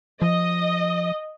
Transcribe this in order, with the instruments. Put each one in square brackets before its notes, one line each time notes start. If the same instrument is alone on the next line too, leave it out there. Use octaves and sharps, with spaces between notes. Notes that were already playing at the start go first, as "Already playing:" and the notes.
[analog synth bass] F3 [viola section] D#5